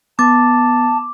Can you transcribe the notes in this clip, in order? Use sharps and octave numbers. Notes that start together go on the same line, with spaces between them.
B3 A5 D6 A6